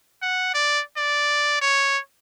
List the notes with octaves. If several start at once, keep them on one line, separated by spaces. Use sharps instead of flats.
F#5
D5
D5
C#5